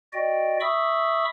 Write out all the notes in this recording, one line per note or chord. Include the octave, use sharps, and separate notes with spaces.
F#4 D5 D#5 G5
E5 B5 C#6 D#6 E6